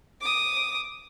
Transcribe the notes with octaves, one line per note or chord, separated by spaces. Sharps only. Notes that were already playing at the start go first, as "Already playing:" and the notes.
D6 D#6